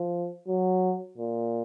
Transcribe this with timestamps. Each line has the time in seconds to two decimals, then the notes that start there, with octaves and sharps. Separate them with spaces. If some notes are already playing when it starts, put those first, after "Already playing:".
Already playing: F3
0.48 F#3
1.18 A#2